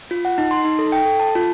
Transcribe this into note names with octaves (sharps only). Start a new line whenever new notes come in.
F4
F#5
D#4
C6
D#4
A4
G5
A4
A5
F4